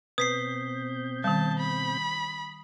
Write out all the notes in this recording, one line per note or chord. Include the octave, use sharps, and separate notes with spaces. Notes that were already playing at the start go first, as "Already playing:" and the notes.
B2 C4 B4 D#6 G6 B6 C7
D#3 G3 A5
B5